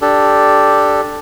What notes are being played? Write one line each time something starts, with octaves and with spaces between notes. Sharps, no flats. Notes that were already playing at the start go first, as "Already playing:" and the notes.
D4 G4 A4